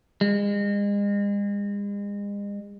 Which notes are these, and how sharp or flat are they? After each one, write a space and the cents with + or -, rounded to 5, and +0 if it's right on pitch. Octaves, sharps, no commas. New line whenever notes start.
G#3 -40